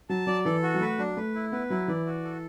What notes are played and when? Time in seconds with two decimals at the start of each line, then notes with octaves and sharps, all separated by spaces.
0.09 F#3 A5
0.27 F#3 D5
0.45 E3 A4
0.63 F#4
0.74 F#3
0.81 A3 B4
0.99 F#3 D4
1.17 A3 B4
1.34 E4
1.52 B3 B4
1.70 F#3 E4
1.88 E3 D5
2.06 F#4
2.24 A4